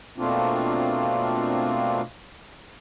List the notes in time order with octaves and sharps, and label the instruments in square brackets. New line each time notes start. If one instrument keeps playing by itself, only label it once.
[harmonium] B2 A3 A#3 C4 D4 F4